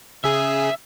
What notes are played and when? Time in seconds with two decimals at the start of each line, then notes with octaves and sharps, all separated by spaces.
0.24 C#3 G#4 E5